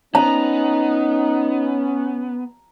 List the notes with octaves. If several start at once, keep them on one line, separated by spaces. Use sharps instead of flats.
B3 C#4 D#4 A#5